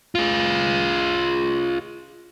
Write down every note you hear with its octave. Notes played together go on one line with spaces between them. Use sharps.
F4 G#4